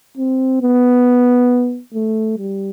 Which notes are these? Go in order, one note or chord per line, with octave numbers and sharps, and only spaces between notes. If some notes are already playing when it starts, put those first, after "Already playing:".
C4
B3
A3
G3